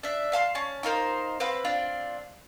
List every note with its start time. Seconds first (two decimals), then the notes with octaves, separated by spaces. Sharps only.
0.03 D4 E5
0.32 E5 F5 A5 C6
0.55 C#4 A5
0.83 D#4 F4 A#4 C5
1.40 C4 B4 F5 F#5
1.65 C4 D4 F4